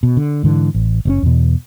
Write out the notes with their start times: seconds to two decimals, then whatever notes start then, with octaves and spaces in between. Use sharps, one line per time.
0.03 B2
0.17 D3
0.43 G#2 D3 E3
0.75 A1
1.05 F#1 B2 C#4
1.23 E2 B2